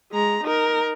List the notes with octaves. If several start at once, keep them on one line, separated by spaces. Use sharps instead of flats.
G#3 A#5
D#4 A#4